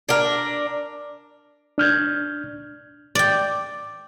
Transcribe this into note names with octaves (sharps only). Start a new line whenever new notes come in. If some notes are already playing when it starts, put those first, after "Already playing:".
D4 A#4
D4 F6 G6 G#6
D5 G5